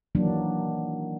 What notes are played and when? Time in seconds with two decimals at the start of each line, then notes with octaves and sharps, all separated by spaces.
0.15 D#3 E3 F#3 A#3 D4